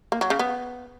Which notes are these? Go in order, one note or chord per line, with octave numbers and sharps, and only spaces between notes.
A#3
F#3
C#3
B3